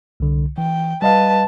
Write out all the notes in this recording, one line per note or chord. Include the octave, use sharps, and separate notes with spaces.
C2 D3
E3 G5
G3 B4 D#5 F5 A5